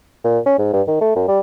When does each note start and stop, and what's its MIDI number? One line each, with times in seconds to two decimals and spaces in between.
0.24 0.39 46
0.46 0.58 61
0.58 0.71 44
0.73 0.82 43
0.87 1.01 51
1.01 1.11 57
1.16 1.27 42
1.28 1.40 55